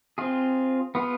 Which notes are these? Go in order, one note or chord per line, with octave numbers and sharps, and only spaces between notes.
C4 F4 G#4
B3 F4 G#4